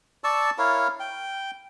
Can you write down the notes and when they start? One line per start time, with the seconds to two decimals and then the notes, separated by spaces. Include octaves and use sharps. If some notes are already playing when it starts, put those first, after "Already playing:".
0.24 D5 A5 C#6 E6
0.58 E4 A#4 C#5 F5
1.00 G5